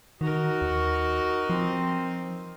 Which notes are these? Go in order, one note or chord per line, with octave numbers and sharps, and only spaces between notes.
D#3 D#4 F#4 A#4
D#2
F3 C4